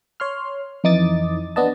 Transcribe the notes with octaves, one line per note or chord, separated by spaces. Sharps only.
C#5 C6 F6
F2 E3 D#4 D6 D#6 A6
B3 D4 D#5 A5